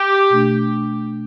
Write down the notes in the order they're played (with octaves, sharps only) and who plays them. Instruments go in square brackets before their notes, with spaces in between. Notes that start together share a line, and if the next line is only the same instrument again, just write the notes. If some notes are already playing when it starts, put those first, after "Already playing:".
Already playing: [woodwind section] G4
[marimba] B2 A3 D4